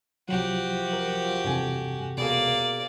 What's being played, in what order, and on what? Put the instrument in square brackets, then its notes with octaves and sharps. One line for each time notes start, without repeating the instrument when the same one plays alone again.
[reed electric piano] C2 F#3 [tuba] F3 [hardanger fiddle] F#4 G4
[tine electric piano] A#4
[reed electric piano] E2 C3 A4 [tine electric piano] G2 G#5
[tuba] C#2 [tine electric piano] B2 G#4 [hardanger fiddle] A#3 D5